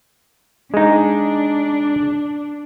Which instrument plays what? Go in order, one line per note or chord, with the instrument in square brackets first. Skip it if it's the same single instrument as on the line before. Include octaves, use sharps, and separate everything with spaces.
[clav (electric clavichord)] G#3 D#4 [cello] D4